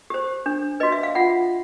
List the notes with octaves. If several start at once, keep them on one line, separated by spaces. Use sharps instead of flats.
G4 C5
D4
F#4 B4 D#5
E5
F5
F4 F#5